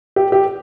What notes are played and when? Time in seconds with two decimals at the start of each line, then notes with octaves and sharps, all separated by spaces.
0.16 G4
0.32 G4